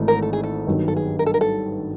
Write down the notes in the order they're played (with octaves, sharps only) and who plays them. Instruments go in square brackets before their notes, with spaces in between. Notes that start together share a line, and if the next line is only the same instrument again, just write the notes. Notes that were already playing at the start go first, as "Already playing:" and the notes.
Already playing: [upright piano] G#1 G#2 E3 A3
[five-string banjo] A#4
A4
G#4
A4
[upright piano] G2 D#3 F#3 B3
[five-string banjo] A4
G#4
A#4
A4
A#4
A4